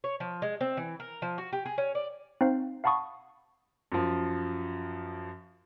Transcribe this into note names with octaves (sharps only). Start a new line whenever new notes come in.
C#5
F3
G#3
C4
E3
A#4
F3
F#4
G4
G#4
C#4
D5
C4 D#4 C5 F5
F5 F#5 A5 B5 C#6 D#6
F#2 F3